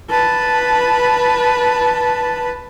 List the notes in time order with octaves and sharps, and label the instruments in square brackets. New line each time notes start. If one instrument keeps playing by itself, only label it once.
[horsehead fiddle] B4 A5